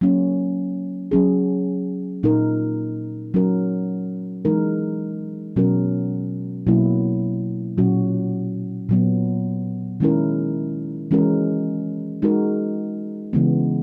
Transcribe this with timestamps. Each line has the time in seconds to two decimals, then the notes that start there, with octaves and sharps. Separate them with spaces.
0.01 F#3 A#3 C#4
1.11 F#3 C#4 G#4
2.23 A#2 A#3 D#4 A#4
3.34 F#3 C#4 F#4 A#4
4.45 E3 G#3 D#4 A#4
5.56 B2 F#3 C#4 F#4 A#4
6.67 B2 F#3 A#3 E4
7.78 A#2 F#3 C#4 F#4
8.89 A#2 F#3 B3
10.00 D#3 G#3 C#4 E4 A#4
11.11 E3 G#3 C#4 F#4 A#4
12.22 G#3 D#4 F#4 A#4
13.33 C#3 E3 G#3 B3